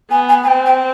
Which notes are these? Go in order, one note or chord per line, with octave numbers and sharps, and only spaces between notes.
B3 G#5
G#5
G#5
C4 G5
G5